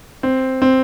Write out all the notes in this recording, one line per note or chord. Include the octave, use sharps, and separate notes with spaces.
C4
C4